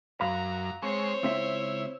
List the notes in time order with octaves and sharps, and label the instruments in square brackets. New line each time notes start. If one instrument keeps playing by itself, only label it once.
[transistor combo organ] F#2 [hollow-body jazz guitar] F5 B5 [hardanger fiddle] A#5
[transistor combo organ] G#3 C4 C#6 [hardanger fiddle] C5 C#5
[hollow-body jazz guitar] C#2 C4 E5 [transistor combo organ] E4